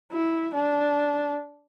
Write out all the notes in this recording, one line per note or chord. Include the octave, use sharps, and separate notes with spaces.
E4
D4